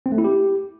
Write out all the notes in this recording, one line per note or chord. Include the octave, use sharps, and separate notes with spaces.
C4
A3
E4
G4